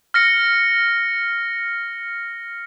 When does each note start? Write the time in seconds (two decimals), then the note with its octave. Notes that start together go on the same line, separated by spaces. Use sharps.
0.14 F6 A#6 C#7